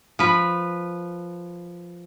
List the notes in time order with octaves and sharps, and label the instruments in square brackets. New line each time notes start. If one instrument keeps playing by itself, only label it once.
[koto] F3 B4